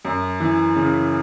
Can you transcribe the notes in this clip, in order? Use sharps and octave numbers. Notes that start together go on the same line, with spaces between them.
F#2
E3
C#3